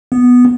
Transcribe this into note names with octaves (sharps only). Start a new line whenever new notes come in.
B3